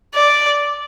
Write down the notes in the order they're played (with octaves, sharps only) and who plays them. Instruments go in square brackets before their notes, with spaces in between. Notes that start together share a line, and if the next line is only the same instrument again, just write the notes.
[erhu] D5